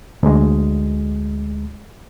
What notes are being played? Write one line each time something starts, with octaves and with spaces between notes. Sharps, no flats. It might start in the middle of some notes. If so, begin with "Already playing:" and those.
D2 G#3